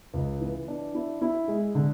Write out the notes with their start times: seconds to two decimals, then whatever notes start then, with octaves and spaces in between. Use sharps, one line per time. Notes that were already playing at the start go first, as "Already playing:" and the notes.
0.14 C#2
0.40 E3
0.68 D4
0.95 E4
1.22 E4
1.48 G#3
1.75 D3